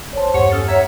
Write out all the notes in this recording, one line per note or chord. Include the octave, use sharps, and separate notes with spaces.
A#1 C5 C#5 A5
E2 G2 G4 C#5 F#5 C#7
C#4 A4 D#6 F6 A6
C#5 E5 F#5 A#5 G#6 C#7